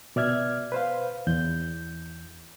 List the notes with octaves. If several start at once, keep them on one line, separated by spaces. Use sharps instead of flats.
B2 D5 E5 F6 G#6
B4 C5 F5
E2 G6